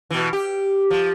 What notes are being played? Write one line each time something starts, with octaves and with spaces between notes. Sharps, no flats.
B2 E3
G4
F3